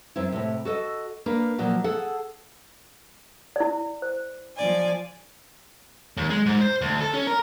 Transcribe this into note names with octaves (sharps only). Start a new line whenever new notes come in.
F#2 C4 E4
A2 C3
F#4 A4 C#5 D#5
A#3 D4 A#4 B4
A#2 F3 F#3 A#3
G#4 A4 F#5
E4 D5
C5
F3 D5 G#5
D#2
G#3
G#2
C5
D2
A4
C#4
A#4